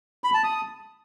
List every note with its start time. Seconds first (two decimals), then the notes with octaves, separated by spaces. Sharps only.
0.24 B5
0.34 A5
0.44 D#6